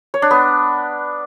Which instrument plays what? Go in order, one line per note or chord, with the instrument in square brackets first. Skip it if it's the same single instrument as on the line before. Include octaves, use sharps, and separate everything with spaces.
[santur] C#5
D4
B3